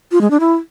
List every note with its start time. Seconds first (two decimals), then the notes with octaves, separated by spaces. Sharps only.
0.12 F4
0.21 G#3
0.31 D4
0.40 E4